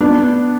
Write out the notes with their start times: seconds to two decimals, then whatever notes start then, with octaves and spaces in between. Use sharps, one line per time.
0.01 B3 D4